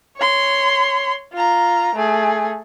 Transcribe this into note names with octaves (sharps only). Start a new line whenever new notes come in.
C#5 C6
F4 A#5
A3 G#4